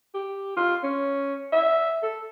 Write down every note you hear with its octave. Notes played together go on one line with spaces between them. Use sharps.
G4
F4
C#4
E5
A4